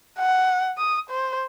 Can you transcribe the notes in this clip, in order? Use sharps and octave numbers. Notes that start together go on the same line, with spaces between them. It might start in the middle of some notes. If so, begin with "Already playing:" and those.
F#5
D#6
C5